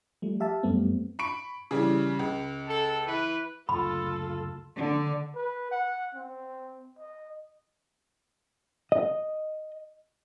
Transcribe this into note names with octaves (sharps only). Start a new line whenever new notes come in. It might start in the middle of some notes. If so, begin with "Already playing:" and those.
F3 G3 A3
G4 E5 F5 A5
F#2 G3 A3 B3 C4
B5 C#6 D7
C#3 E3 G3
C#2
A4
E3 B4
F#1 D2 F4 A4 B5
D3
B4
F#5
C4
D#5
D#5